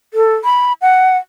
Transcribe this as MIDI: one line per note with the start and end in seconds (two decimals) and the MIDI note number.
0.14 0.34 69
0.44 0.73 83
0.82 1.18 78